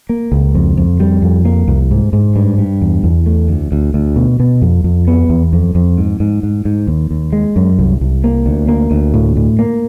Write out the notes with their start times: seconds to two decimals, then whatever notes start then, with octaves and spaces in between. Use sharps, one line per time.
0.09 A#3
0.32 C#2
0.55 F2
0.77 F2
1.00 G3
1.22 F2
1.45 A#3
1.68 C2
1.91 G#2
2.13 G#2
2.36 G2
2.58 G2
2.81 E2
3.04 E2
3.26 A3
3.49 D2
3.72 D2
3.94 D2
4.16 B2
4.40 B2
4.62 F2
4.84 F2
5.08 B3
5.29 E2
5.53 F2
5.75 F2
5.97 G#2
6.20 G#2
6.43 G#2
6.65 G#2
6.87 D#2
7.11 D#2
7.33 G#3
7.56 F#2
7.78 C2
8.01 C2
8.24 A#3
8.46 D2
8.68 A#3
8.91 D2
9.14 A2
9.36 A2
9.59 A#3